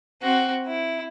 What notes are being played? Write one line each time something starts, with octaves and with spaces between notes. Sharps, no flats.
C4 F#4
E4